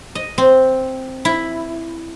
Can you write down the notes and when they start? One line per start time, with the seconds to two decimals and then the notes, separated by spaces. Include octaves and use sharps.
0.15 D#5
0.38 C4
1.25 E4